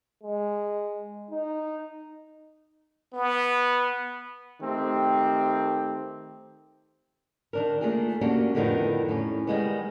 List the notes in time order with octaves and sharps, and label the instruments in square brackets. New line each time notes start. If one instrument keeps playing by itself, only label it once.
[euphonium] G#3
D#4
[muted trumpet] B3
[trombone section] D#3 A3 C4 G4
[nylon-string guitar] D#3 D4 A#4
A3 A#3 D4 F4 G#4
A#3 C#4 D4 F#4 G4
F2 A2 D3 D#3 B3 D#4
A2 G3 C#4
D#3 G3 G#3 B3